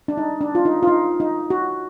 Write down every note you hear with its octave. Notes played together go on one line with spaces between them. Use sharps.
D4
D#4
D4
F4
D#4
F4
D#4
D#4
F#4